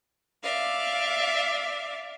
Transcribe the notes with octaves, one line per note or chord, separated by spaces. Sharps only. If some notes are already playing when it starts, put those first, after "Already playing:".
D5 E5 F5